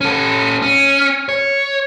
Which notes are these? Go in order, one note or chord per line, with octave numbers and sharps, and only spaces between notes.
C#4 A4
C#4
C#5